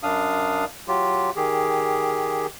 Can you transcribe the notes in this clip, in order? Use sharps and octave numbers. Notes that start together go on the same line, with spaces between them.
F#2 D4 F5 D#6
F#3 F4 G4
D#3 G4 G#4